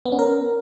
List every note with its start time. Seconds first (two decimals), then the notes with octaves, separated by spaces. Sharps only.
0.05 B3
0.12 C#4
0.19 A#4